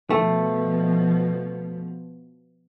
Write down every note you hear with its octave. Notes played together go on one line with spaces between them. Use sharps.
B2 F3 A3